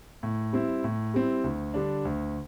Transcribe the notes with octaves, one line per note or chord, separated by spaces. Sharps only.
A2
G3 C4 E4
A2
G3 C4 E4
D2
D3 G3 D4
D2